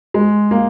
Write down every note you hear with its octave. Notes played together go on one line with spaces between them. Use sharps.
G#3
A#3